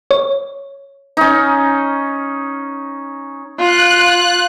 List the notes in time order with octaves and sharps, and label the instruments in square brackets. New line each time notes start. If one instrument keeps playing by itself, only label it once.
[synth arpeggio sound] C#5
[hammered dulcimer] C#4 D#4
[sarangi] F4 [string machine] F#6